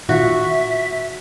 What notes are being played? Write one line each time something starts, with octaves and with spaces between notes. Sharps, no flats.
A#2 D#3 F4 F#4 E5